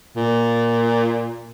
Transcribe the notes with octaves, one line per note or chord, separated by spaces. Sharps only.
A#2